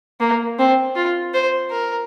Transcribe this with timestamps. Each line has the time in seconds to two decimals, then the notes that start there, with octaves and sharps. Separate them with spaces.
0.20 A#3
0.59 C4
0.96 F4
1.34 C5
1.71 A#4